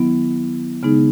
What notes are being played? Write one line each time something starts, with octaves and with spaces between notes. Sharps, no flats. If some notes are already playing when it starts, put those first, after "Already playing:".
Already playing: D#3 F#3 B3 E4
C#3 G#3 B3 D#4 G#4